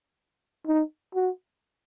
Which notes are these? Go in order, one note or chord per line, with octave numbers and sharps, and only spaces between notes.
D#4
F#4